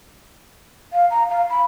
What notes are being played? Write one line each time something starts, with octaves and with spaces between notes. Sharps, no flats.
F5
A#5
F5
B5